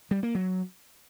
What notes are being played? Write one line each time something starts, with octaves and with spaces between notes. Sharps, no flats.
G3
A#3
F#3